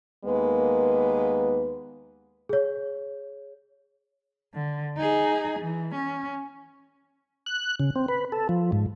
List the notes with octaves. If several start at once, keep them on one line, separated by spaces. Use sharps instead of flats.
D#2 G#3 A#3 B3 B4
G#4 C#5
D3
D#4 G#4
E3
C#4
F#6
C#3
C4
B4
A4
F3
G#2